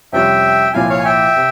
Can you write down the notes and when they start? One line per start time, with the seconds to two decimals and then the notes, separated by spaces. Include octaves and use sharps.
0.13 F2 C3 G3 C#4 F4 E5 G5
0.73 C2 A#2 F3 C4 E4 F5 G#5
0.89 C#5 F5
1.00 G#5
1.05 E5 G5
1.36 C3